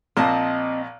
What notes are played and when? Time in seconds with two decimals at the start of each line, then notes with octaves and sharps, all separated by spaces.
0.17 A#1 A#2 C4 D#5 A5